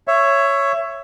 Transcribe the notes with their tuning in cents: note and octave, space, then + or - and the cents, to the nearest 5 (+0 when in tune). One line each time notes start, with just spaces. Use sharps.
C#5 +0 E5 +20